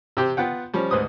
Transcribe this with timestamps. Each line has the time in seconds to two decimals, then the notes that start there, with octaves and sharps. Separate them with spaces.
0.17 C3 G4 C5
0.37 B3 F4 F#5 G5
0.74 F3 G3 C#4
0.91 D2 G#2 B4 C5 D#6